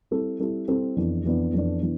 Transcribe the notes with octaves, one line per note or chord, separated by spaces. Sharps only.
G3 C4 E4 A4
G3 C4 E4 A4
G3 C4 E4 A4
F2 E3 B3 D4
F2 E3 B3 D4
F2 E3 B3 D4
E3 B3 D4